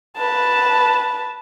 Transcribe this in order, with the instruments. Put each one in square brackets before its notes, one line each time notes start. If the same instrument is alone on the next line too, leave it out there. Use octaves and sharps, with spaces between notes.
[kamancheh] B4 A5